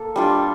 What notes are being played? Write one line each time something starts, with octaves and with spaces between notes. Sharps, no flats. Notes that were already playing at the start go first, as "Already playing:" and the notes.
Already playing: A#3 A4
G3 D4 F4